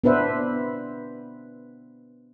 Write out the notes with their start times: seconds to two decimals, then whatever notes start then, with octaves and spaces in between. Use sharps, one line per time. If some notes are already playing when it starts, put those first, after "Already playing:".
0.04 B3 D4 B4 C5 E5